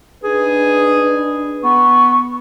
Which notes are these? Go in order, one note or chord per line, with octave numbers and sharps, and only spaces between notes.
D4 D#4 G#4 B4
B3 C#6